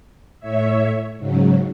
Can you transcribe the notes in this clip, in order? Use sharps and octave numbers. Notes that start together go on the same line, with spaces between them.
A2 C#5 E5
G#2 C#3 F#3